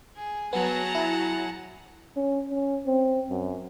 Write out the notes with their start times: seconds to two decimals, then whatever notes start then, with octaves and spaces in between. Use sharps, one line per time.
0.16 G#4
0.53 F#3 B3 G#4 F#5 A5 A#5
0.95 E4
2.17 C#4
2.50 C#4
2.87 C4
3.30 F#2